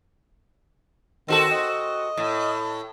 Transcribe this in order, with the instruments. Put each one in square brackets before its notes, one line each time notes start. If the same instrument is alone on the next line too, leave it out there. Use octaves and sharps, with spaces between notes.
[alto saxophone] D#3 [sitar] C4 F#4 A4
[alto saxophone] D#5
[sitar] A2